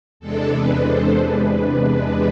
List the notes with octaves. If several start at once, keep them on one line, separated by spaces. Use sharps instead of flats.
E2 C3 G#3 D4 A4
B4
A4 C5
B4
B4